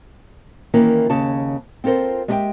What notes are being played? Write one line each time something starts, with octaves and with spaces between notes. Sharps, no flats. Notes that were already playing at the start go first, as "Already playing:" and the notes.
D#3 E3 A#3 C#4 E4 A#4
D#2 C#3 C#5 A5
C4 F4 A4 A#4 C5
G#3 G4 A4 D#5 E5 G5